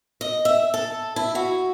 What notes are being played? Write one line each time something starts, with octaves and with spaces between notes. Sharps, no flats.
D#5
E5
A4
E4
F#4